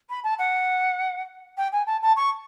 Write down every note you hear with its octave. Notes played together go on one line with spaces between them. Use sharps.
B5
A5
F#5
G5
G#5
A5
A5
C#6